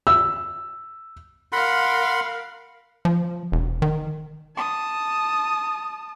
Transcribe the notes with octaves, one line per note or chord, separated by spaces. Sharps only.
E6
A#4 F5 F#5 B5 C6
F3
E1
D#3
A5 D#6